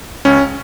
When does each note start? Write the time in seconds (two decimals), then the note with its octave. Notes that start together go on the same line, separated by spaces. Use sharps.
0.25 C#2 C#4